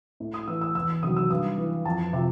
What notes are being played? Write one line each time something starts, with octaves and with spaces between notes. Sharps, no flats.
A2
D#6
E3 E6
E6
E2 E6
C3 D#3 F#3 D#6
E6
G2 D#6
E3
F2 A5
C3 F3